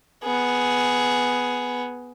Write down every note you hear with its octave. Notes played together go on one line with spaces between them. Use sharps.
B3 G#4